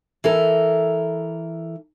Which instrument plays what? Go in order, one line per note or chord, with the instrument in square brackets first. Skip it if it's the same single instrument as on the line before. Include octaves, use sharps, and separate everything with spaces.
[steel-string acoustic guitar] E3 A4 A#4